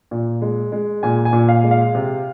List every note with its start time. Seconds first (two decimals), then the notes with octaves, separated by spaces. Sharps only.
0.11 A#2
0.42 G#3
0.72 G#3
1.03 A#2 G#5
1.25 G#5
1.33 A#2
1.49 F5
1.63 G#3
1.71 F5
1.95 C3